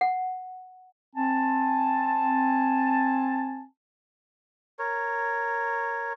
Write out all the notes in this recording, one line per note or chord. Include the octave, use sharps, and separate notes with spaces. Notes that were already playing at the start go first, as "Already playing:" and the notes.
F#5
C4 G#5 A5
A#4 C#5